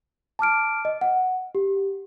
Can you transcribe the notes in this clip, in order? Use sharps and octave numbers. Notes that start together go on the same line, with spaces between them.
A5 D6 F6 D7
D#5
F#5
G4